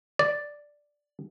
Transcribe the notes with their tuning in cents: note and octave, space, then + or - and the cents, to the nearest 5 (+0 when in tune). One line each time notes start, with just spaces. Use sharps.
D5 +0